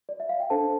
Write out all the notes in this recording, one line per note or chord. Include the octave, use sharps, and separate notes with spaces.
D5
E5
F5
G5
D4 A4 C5 A5